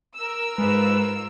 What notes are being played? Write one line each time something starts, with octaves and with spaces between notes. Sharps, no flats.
A#4 E6
G#2 G#3 F4 B4